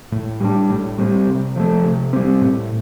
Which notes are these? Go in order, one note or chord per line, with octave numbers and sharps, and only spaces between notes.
A2
G3 D4
A2
G3 C4
C3
F3 A3
C3
G3 C4
A2